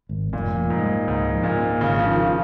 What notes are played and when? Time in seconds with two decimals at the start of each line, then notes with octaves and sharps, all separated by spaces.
0.09 G#1
0.33 F1 A#2
0.57 F3
0.70 G#2
0.82 G#3
1.07 C#2 G#2
1.32 F3
1.44 A#2
1.56 A#3
1.80 G#1 C#3
1.99 F3
2.05 D#3
2.18 F3